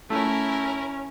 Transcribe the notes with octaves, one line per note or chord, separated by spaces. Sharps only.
A3 C#4 E4 A#4